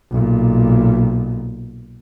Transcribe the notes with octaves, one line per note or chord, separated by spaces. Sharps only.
B1 A#2